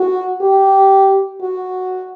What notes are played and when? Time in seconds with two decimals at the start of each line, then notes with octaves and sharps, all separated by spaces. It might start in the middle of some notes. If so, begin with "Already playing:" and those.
Already playing: F#4
0.41 G4
1.41 F#4